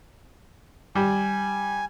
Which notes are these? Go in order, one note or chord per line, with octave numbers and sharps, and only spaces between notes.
G3 G#5